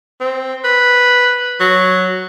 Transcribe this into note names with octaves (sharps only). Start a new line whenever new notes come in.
C4
B4
F#3